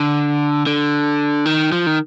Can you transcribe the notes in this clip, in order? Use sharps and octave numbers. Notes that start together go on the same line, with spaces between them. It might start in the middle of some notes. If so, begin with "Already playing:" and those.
Already playing: D3
D3
D#3
F3
D#3